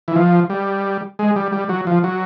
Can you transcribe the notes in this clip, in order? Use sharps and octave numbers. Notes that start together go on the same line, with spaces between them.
E3
F3
G3
G#3
G3
G3
F#3
F3
F#3